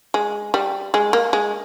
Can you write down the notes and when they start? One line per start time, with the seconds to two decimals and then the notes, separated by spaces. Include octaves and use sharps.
0.14 G#3
0.54 G3
0.94 G#3
1.13 A#3
1.33 G#3